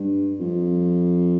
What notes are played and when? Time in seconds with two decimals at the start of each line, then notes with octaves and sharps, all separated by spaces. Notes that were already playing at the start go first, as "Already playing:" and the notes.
Already playing: G2
0.39 F2